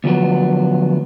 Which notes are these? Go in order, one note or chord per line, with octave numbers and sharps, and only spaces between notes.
D2 F3 F#3 B3